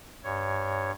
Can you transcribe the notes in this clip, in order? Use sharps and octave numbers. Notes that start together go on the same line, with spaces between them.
G2 C#5